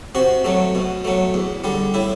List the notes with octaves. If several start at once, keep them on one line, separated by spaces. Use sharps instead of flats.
C3 F#4
F#3 A3
B2
F#3 A3
E2
D3 G3
A2 E4